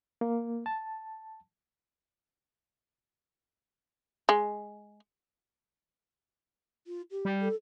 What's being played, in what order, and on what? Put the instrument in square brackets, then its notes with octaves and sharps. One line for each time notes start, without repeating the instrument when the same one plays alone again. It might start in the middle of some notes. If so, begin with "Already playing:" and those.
[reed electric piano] A#3
A5
[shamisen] G#3
[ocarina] F4
G4
[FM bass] G3
[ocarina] A4